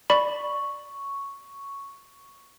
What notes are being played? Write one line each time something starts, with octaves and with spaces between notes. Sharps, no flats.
D5 B5 C#6